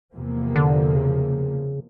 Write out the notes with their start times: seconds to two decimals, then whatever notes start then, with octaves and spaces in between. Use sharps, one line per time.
0.15 E2 C3 F3 A#3
0.56 D3
0.96 C#3